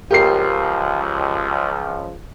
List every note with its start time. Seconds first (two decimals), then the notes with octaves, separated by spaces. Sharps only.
0.11 C#2 F3 G4 A#4 C7